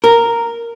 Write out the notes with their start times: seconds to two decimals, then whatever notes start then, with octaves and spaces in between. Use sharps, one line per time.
0.04 A#4